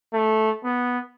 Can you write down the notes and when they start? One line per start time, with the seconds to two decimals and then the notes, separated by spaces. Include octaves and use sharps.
0.13 A3
0.64 B3